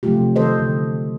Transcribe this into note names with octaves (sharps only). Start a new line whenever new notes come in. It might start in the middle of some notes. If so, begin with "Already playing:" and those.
C3 F3 F#3 A3 F4 G4
D#3 A4 C5 D#5
D3